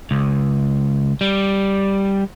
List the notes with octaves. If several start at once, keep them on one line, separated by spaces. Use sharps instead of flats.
C#2
G3